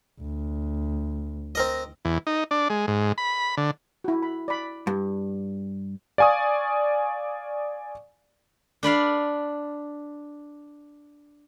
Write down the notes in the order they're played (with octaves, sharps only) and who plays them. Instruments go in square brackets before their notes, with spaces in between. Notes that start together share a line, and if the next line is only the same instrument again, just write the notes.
[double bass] D2
[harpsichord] C4 A#4 D#5
[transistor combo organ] E2
D#4
D4
G#3
G#2
B5
D3
[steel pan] E4 F#4
B5
D5 B5
[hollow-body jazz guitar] G2
[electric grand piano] D5 F5 G#5 C#6 D#6
[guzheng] D4 B4 D5 F5